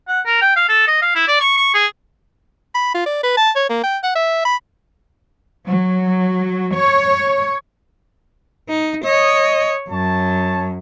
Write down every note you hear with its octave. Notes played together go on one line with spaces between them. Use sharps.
F#5
A#4
G5
F5
A4
D#5
F5
E4
D5
C#6
C#6
G#4
B5
F4
D5
B4
A5
C#5
A#3
G5
F#5
E5
B5
F#3
C#5
D#4
C#5 D#5
F#2 C#5 A5